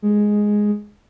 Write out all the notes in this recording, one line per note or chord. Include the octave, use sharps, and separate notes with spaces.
G#3